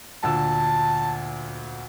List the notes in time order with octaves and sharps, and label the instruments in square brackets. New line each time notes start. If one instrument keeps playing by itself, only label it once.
[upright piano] D2 A#2 E6 [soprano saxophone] A5